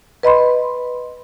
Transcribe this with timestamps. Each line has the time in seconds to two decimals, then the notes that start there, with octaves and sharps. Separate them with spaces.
0.23 B4 D#5 B5 C6